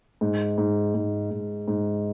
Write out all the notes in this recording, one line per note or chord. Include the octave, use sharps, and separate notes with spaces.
G#2
G#2
G#2
G#2
G#2